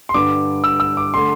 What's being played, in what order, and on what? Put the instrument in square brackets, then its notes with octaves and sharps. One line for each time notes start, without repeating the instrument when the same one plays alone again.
[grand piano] C6
G2 D3 G3 D6
E6
E6
D6
D3 A3 C6